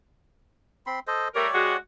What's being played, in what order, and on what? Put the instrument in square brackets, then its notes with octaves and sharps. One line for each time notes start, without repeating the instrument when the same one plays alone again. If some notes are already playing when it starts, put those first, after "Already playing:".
[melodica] C4 B5 C6
A4 C5 D#5
[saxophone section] G3 A3 A#4 [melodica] G4 C#5 D5
[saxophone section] G#3 F#4